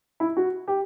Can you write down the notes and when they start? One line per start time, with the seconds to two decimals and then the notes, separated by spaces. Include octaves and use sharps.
0.20 E4
0.37 F#4
0.68 G4